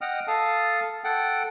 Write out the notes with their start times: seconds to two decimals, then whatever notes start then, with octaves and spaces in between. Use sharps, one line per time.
0.01 D#5 F#5 G5 D#6 F6
0.27 A4 F5 A5 D#6
1.04 A4 F#5 G5